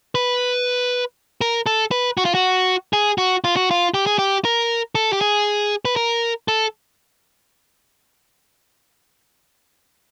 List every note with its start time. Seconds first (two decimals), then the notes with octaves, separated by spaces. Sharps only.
0.15 B4
1.41 A#4
1.66 A4
1.91 B4
2.17 F#4
2.25 F4
2.34 F#4
2.93 G#4
3.18 F#4
3.44 F4
3.56 F#4
3.71 F4
3.94 G4
4.06 G#4
4.19 G4
4.45 A#4
4.95 A4
5.13 G4
5.21 G#4
5.85 B4
5.96 A#4
6.48 A4